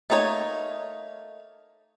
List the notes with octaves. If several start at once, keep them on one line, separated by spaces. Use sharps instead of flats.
A3 A#3 D#4 G#4 C#5